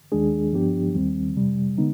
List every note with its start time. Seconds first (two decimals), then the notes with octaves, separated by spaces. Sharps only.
0.12 D#2 D#3 G#3 D4 G#4
0.53 G2 F3 B3 D4 G4
0.95 D#2 D#3 G3 C4
1.36 F2 C3 G3
1.77 D3 G#3 B3 D#4